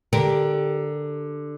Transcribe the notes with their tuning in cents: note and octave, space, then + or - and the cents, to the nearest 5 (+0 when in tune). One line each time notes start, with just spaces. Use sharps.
D3 +10 G4 +0 A#4 +5